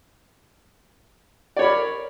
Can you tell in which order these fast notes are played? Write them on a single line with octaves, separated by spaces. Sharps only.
D5 C#5 B5 A#4